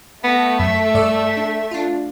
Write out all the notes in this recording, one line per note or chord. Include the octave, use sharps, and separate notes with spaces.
A3 B3 A#6 B6
F#2 E5 B6
G2 D5 E6
D4
D4 F4